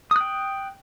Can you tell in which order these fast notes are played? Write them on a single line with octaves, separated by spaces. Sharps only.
D#6 F#6 G5